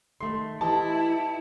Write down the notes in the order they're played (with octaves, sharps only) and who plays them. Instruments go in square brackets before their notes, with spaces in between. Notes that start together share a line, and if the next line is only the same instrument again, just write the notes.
[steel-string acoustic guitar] D#3 A3 [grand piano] C6
[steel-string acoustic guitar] E3 G4 D#5 [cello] E4 [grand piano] A5